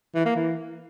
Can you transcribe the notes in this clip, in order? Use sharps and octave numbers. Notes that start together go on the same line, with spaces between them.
E3
A#3
E3